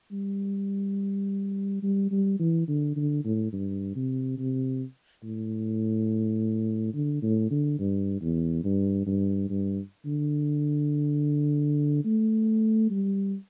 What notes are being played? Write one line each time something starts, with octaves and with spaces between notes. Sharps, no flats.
G3
G3
G3
E3
D3
D3
A2
G2
C3
C3
A2
D3
A2
D3
G2
E2
G2
G2
G2
D3
A3
G3